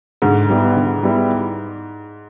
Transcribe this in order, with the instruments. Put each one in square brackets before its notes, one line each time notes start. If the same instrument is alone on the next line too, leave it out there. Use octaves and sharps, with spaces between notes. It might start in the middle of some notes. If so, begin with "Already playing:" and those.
[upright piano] G#2 [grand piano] D3
[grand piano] G3 B3 E4
D3
G3 B3 E4